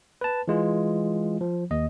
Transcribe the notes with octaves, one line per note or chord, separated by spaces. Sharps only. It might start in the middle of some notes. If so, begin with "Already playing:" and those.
B4 A5
E3 G#3 F4
F3
D#2 D#5